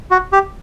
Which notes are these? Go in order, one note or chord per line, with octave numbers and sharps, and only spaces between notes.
F#4
G4